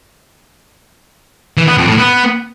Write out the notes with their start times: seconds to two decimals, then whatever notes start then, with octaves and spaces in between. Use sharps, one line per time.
1.57 E3
1.67 B3
1.77 F2
1.87 A2
1.97 B3